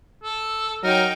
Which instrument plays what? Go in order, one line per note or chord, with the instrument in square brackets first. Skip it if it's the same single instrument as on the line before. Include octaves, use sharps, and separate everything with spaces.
[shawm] A4
[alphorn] F#3 [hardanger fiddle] D#4 G5 [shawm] A#4